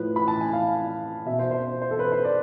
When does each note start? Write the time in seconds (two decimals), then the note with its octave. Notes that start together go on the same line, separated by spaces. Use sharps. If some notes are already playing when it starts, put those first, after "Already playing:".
Already playing: A2 F3 B4
0.16 B5
0.28 A5
0.41 G#5
0.53 F5
1.26 B2 E5
1.39 C5
1.51 C5
1.82 C5
1.91 A4
1.99 B4
2.12 C5
2.24 D5